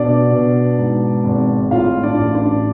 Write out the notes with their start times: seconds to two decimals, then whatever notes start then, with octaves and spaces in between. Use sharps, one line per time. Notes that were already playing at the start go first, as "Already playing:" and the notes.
Already playing: B2 D4 D5
0.30 B2
0.78 G#2
1.24 G#1
1.71 A2 F4 F5
2.03 D4 D5
2.19 A1
2.35 D4 D5